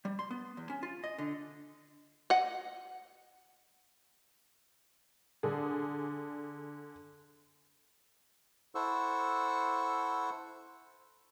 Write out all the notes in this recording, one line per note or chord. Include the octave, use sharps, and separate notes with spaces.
G3
C6
B3
E2
C#4
F4
D#5
D3
D#5 F#5
D3 D4 G#4
E4 A4 C5 F#5 C#6 E6